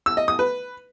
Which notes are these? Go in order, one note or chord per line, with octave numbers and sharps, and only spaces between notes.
E6
D#5
D#6
B4